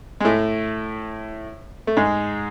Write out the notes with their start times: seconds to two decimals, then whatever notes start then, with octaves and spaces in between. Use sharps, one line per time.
0.20 G#3
0.25 A2 A3
1.87 A3
1.97 G#2 G#3